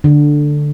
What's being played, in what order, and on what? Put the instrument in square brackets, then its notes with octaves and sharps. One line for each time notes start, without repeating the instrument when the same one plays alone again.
[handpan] D3